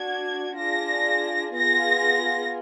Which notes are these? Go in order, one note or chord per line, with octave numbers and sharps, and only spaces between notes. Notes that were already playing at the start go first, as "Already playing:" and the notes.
Already playing: D4 F#4 G#6
D4 F4 G#4 A#6
B3 F4 G#4 A#6